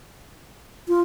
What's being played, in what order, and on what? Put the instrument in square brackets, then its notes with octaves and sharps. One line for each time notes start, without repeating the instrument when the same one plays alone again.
[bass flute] F4